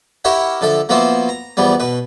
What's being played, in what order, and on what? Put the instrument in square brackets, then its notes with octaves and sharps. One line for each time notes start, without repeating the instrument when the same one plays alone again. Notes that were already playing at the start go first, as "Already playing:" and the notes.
[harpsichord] E4 G4 A#4 C#5 E5 F#5
D3 F3 A4 E5
F3 A#3 B3 F#4 C5 E5
A#5
E2 F3 G3 B3
B2 B4